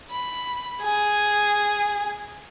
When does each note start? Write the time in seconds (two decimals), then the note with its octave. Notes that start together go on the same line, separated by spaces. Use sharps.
0.11 B5
0.82 G#4